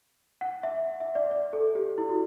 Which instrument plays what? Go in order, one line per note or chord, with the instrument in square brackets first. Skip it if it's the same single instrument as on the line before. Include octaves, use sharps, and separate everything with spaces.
[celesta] F#5
E5
E5
D5
D5
A4
G4
E4
F#4